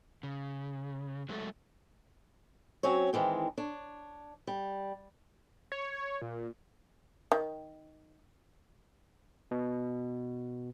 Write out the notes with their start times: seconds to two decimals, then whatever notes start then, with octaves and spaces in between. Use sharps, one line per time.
0.23 C#3
1.29 F#3 G#3 A3 F#4 A4
2.83 F#3 C4 C#4 C#5
3.13 D#3 E3 G#3 C4
3.58 D4 C#5
4.47 G3
5.72 C#5
6.22 A#2
7.32 D#3
9.51 B2